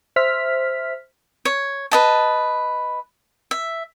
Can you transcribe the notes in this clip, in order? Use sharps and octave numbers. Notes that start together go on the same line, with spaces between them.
C5 E5 F6 B6
C#5
B4 D#5 A5
E5